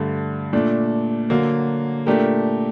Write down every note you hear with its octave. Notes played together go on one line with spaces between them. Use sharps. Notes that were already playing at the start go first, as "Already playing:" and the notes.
Already playing: G2 D3 A3
A#2 A3 D4
D3 F#3 A#3
A#2 A3 D4 G4 A#4